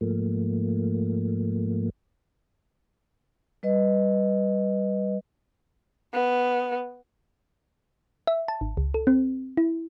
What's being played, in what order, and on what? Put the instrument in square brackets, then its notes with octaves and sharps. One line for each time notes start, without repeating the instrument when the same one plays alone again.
[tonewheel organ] G#2 F3 A3 A#3
[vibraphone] G3 B4 D#5
[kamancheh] B3
[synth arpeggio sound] E5
A5
G#1
C#2
A4
C4
E4